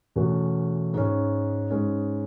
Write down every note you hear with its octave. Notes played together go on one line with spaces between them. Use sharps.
E2 B2 A3 C#4 F#4
G#2 G#3 C#4
G#2 G#3 C#4